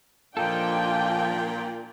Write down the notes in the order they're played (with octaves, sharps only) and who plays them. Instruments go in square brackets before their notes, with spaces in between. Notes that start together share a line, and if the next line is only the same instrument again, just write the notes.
[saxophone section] A#2 [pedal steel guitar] F3 D#4 A4 [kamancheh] D4 F4 [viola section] G5